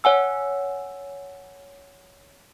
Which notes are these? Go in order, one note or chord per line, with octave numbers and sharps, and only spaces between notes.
C#5 F#5 G#5 E6